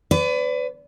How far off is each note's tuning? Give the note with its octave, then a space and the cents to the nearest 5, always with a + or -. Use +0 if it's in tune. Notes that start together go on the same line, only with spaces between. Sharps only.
B4 +30 D5 -30